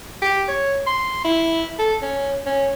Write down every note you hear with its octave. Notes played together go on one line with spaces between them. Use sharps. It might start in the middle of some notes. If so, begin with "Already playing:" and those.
G4
C#5
C6
E4
A4
C#4
C#4